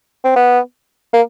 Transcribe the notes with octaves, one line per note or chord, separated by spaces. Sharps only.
C4
B3
A#3